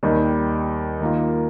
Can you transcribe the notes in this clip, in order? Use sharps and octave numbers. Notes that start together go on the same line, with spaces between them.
D#2 D#3 G3
D#3 A#3 F4